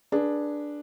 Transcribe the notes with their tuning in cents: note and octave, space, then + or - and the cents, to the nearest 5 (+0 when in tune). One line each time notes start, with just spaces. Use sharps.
D4 +0 G#4 +0 B4 -25